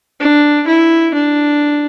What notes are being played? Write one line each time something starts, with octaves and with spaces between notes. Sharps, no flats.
D4
E4
D4